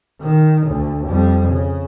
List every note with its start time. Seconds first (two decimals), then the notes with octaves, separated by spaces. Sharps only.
0.21 D#3
0.67 D2
1.08 F2 G3
1.49 C#3